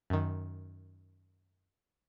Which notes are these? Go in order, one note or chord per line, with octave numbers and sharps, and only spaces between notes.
F#2 D#3